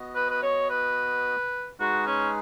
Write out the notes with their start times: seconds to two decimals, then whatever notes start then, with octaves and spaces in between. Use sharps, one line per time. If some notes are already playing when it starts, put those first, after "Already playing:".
Already playing: B3 F#4 D#5
0.15 B4
0.31 B4
0.42 C#5
0.70 B4
1.80 G#3 D#4 F#4 G#4 B4
2.07 C#4